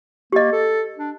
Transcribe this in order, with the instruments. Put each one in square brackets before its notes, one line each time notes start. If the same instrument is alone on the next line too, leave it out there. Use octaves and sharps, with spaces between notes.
[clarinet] A#3 [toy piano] G4 D#5
[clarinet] A4
D4